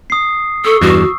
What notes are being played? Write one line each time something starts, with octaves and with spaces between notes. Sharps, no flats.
D#6 C7
A4 C#6 E6
E2 G2 F#4